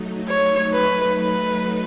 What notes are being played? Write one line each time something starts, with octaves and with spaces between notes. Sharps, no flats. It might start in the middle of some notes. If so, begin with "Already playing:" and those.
Already playing: F#3 A3 D#4
C#5
B4
B4